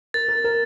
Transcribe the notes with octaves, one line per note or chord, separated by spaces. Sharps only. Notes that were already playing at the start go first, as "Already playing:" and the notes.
A#4 A6
A#4
A#4